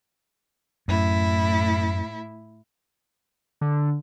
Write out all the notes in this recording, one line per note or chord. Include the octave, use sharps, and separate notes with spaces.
F#2 A2 E4
D3